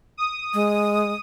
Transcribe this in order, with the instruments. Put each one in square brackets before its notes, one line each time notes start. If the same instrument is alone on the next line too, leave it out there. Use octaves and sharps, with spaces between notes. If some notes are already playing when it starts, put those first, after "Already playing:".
[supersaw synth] D#6
[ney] G#3